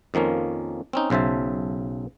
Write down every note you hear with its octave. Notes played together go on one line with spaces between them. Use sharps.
F2 D#3 F3 A#3 C#4
C4 C#4 D#4
B1 C#3 C5 E5 A5